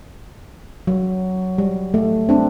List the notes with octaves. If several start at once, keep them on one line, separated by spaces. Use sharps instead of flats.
F#3
G3
A3
C4 D4